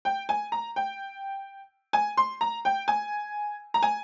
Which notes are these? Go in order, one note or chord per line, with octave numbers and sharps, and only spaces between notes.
G5
G#5
A#5
G5
G#5
C6
A#5
G5
G#5
A#5
G#5